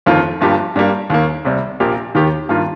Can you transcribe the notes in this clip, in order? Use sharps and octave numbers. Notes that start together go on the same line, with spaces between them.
G1 F2 D#3 A#3 F4
G1 G2 F3 A#3 G4
G2 G3 A#3 G4
D#2 D#3 A#3
C2 C3 G3
A#1 A#2 A#3 G4
D#2 D#3 A#3 G4
G2 D#3 A#3 F4